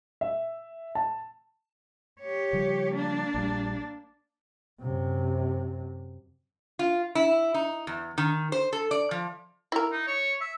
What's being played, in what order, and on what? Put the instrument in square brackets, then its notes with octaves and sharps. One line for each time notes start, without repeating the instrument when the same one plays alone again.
[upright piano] E5
A5
[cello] G4 C#5
[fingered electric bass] C#3 F3 G3
[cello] A#3 D4
[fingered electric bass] A#1 G3
[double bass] F#2 C3
[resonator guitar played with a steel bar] F4
E4
D#4
E2
D#3
C5
A4
D5
F3
[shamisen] E4 A#4
[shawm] D#4
C#5
E5